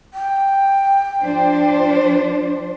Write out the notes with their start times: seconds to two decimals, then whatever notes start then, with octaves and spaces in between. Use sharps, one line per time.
0.14 G5
1.21 F3 D4 C5